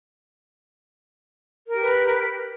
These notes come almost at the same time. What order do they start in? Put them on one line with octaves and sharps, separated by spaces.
A#4 G4 B4